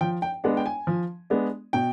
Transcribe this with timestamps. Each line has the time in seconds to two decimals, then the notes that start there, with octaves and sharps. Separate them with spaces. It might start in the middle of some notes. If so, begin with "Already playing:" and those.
0.01 F3 G5
0.22 G5
0.44 G#3 B3 D4 F#5
0.57 G5
0.66 G#5
0.87 F3
1.30 G#3 B3 D4
1.73 B2 G5